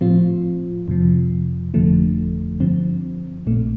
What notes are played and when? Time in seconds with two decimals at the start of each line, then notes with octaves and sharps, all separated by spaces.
0.01 A2 F3 C4 F4
0.88 F2 C3 F3
1.74 G1 F2 D3 F3 A3
2.60 G2 D3 F3 C4
3.46 A#1 A#2 A3